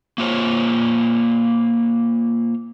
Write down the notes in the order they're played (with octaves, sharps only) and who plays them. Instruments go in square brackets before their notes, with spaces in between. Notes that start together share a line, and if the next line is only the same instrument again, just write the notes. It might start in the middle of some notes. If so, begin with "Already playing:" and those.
[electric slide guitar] A#3 F4 C5 C#5